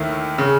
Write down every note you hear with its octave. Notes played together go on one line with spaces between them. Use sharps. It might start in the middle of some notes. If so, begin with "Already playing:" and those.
Already playing: D#2 D#3 A3 E4
C#3